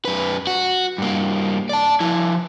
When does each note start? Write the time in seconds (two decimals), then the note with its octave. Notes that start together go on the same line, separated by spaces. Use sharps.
0.05 F#2 B4
0.47 F#4
0.98 G2 A#3
1.69 D5 A5
2.00 F3 E4